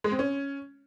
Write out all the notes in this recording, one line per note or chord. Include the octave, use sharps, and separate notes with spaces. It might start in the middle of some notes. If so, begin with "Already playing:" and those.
G#3
C4
C#4